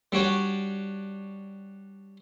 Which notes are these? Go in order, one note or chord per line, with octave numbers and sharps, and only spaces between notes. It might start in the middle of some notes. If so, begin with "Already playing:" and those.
G3 D4 F#4 C#5